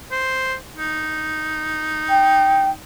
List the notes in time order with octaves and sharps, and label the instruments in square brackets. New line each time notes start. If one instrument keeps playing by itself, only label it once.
[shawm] C5
D#4
[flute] G5